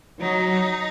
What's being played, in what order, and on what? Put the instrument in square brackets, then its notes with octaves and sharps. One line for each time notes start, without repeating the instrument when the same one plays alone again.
[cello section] F#3 [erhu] D#4